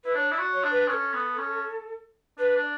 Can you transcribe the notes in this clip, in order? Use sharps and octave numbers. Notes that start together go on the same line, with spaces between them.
E4 B4
D4 C#5
E4 D5
F#4
C#5
D4
B4
C#4 A4 B4
B3
C#4
D4 B4
D4
D5